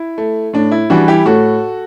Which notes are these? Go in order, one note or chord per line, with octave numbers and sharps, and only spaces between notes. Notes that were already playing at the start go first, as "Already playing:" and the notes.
Already playing: E4
A3
A2 D4
E4
E3 G3 D4 F#4
E4 G4
A2 F#4 A4